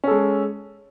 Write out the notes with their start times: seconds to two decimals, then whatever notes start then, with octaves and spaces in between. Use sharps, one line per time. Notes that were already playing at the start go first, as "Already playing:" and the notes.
0.04 C#4
0.07 A4
0.11 G#3